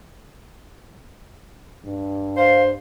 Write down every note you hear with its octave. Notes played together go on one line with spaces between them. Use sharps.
G2
C5 F5